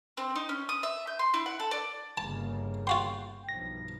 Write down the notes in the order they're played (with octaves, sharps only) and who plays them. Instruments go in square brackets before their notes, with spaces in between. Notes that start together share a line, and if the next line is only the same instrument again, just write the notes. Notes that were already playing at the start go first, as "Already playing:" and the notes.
[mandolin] C4
D#4
C#4
D#6
E5
G6
C6
E4
F#5
A4
D5
[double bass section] G1 C#3 A#3 [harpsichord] A5
[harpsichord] F4 F#4 C6 [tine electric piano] G5
[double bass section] B1 G2 F3 [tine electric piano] A#6